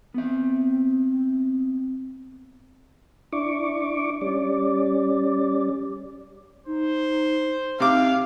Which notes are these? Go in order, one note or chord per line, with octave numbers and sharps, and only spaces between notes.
B3 C4 E5
D4 E4 C#6 D6
G3 C#4 D5
D#4 C5
C3 D#4 F5 D6